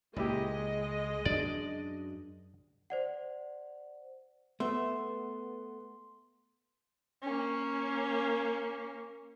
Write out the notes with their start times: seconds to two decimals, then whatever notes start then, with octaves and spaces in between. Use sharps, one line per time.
0.16 C#2 A#2 G#3 E4 G4 D#5
1.26 F#2 D4 D5
2.90 C5 D5 F#5
4.60 A3 B3 E5 C6
7.23 A#3 C#4